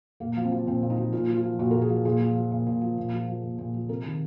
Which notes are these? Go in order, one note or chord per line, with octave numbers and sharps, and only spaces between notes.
A#2 A#3
F3
C4
F3
A#2 C4
A#2
D#4
F3
A#2 F4
F3
F4
F3
A#2 F#4
A#2 A#4
G#4
F3
A#2 G#4
F3
F3
A#2
A#2
F3
A#2
F3
F3
A#2
A#2
F3
C3 A#4
D#3